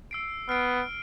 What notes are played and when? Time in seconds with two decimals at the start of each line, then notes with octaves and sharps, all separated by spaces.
0.11 E6 C7 D7
0.49 B3 F6 C7 D7